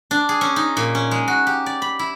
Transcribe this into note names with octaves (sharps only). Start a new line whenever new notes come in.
D4
G#4
C#4
D#4
A#2
C#4
G#3
F#4
G4
D5
B5
E4